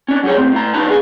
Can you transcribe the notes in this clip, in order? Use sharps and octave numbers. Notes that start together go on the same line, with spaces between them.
C#4 D4
F#3 G3 G#4 C#5
A2 C4
A2 A#5
F#2 D4 D#4 B4 A5
D4 F4 G#4